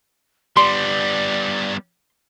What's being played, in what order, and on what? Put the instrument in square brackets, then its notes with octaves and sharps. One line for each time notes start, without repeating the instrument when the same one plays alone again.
[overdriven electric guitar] G3 B3 [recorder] D5 [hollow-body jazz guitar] C6